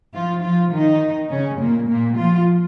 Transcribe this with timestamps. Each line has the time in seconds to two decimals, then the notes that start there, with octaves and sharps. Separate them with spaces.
0.13 F3 F4
0.42 F3 F4
0.71 D#3 D#4
1.30 C#3 C#4
1.59 A#2 A#3
1.89 A#2 A#3
2.17 F3 F4